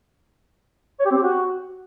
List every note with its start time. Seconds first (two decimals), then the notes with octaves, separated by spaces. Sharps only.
1.00 C#5
1.05 G4
1.11 C4
1.17 G4
1.23 F#4